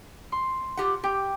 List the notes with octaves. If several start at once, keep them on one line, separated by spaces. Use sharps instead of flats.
C6
F4 G4 F#5
G4 G5